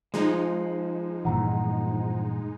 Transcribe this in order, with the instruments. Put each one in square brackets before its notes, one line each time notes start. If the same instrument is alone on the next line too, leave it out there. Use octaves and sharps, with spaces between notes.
[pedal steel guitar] F3 [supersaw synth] G#3 D#4
[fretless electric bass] G2 A#2 E3 [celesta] F#5 A#5